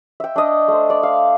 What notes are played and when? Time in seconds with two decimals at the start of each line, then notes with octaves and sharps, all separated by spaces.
0.20 E5 G5
0.36 D4 D#5
0.68 A3 C5
0.90 D5
1.03 F5